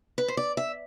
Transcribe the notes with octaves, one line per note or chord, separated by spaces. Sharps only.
B4
C5
D5
E5